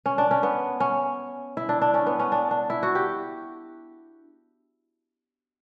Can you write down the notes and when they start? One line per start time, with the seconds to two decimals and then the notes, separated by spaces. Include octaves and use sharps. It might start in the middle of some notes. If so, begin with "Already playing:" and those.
0.06 C#4
0.18 D4
0.31 C#4
0.43 B3
0.80 C#4
1.57 E4
1.69 D4
1.82 D4
1.94 C#4
2.06 B3
2.19 C#4
2.32 D4
2.51 D4
2.70 E4
2.83 F#4
2.95 G4